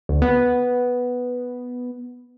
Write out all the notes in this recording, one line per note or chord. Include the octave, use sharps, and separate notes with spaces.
D2
B3